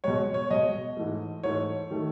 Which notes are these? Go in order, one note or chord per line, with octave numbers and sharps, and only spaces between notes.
B2 G#3 C#5
C#5
B2 G#3 D#5
G#2 E3 A3
G#2 E3 A3 C#5
D#3 A3